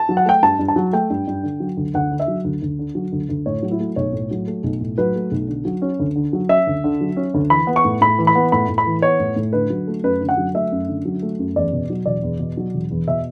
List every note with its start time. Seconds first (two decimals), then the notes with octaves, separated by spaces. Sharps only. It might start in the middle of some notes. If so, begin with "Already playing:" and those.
Already playing: A5
0.09 F#3
0.17 F#5
0.26 A3 G5
0.42 G2 A5
0.59 G2
0.68 A5
0.76 F#3
0.93 A3 G5
1.10 G2
1.27 G2
1.43 D3
1.60 F#3
1.77 D2
1.94 D2 F#5
2.11 D3
2.20 E5
2.28 F#3
2.44 D2
2.62 D2
2.79 D3
2.95 F#3
3.12 D2
3.29 D2
3.46 A2 C#5
3.63 F#3
3.71 E4
3.80 A3
3.96 B1 C#5
4.13 A2
4.31 F#3
4.47 A3
4.64 B1
4.81 A2
4.98 F#3 B4
5.15 A3
5.32 B1
5.48 D3
5.65 F#3
5.82 C#4
5.99 D2
6.15 D3
6.33 F#3
6.49 C#4 E5
6.67 D2
6.84 D3
7.01 F#3
7.17 C#4
7.34 D2
7.50 E3 B5
7.67 B3
7.76 C#6
7.85 A2
8.01 A2 B5
8.19 E3
8.27 B5
8.35 B3
8.52 A2 B5
8.69 A2
8.78 B5
8.86 E3
9.02 B3 C#5
9.20 A2
9.36 A2
9.53 D3 B4
9.70 F#3
9.87 A3
10.03 F#2 B4
10.21 D3
10.29 F#5
10.37 F#3
10.54 A3 E5
10.72 F#2
10.88 D3
11.05 F#3
11.22 A3
11.39 F#2
11.56 E2 D5
11.73 B2
11.90 F#3
12.06 E1 D5
12.23 E2
12.39 B2
12.57 F#3
12.74 E1
12.91 E2
13.07 B2 E5